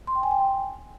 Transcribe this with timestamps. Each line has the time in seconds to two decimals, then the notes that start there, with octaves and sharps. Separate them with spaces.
0.07 C6
0.15 G5
0.23 G#5
0.31 G5